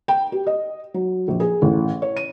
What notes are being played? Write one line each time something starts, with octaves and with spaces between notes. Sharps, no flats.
G5
G4
D#5
F#3
A#1
G#4
A1
C#5
D#7